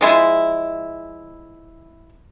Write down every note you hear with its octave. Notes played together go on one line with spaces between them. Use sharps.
F3 G#3 E4